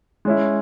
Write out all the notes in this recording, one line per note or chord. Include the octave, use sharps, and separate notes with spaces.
G#3 C#4 E4